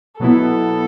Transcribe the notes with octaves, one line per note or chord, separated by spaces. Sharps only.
B2 F#3 B3 E4 A4